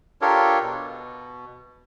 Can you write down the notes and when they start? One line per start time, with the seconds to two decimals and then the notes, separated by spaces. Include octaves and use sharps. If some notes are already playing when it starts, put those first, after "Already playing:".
0.21 D4 F4 G4 A4 A#4 C#5
0.62 B2